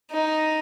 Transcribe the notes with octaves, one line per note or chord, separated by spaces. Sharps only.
D#4